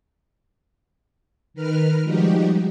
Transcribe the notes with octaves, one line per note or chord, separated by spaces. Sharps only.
D#3 A#4 B4 F6
F3 G3 G#3 D#4 F#4 G4